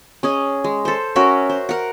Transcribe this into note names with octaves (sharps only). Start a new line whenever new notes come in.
C#4 G#4 D#5
G#3
A4 C5
C#4 F#4 A#4 E5
C5
A#4 F#5